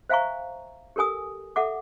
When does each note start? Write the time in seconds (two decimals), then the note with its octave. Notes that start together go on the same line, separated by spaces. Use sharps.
0.09 C5 E5 F5 G#5 A#5 C#6
0.96 G4 A4 A#4 G#5 D#6
1.56 A4 E5 F#5 D6